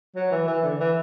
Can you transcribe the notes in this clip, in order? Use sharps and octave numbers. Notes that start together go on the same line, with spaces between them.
F#3
E3
E3
D3
E3